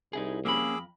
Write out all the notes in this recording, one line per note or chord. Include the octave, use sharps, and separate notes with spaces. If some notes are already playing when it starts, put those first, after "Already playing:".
C2 D#4 E4 G#4
F2 A#3 C#4 G#4 B5 D6 E6